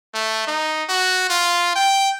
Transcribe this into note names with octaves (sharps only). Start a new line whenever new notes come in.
A3
D#4
F#4
F4
G5